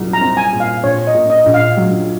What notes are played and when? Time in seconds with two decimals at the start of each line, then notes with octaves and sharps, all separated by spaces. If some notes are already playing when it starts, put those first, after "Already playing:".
Already playing: C2 A#2 F#3
0.13 A#5
0.21 C4
0.37 G#5
0.53 A#2
0.60 F5
0.83 A#1 C#5
1.07 D#5
1.14 A#2
1.30 D#5
1.46 A#1
1.54 F5
1.77 F#3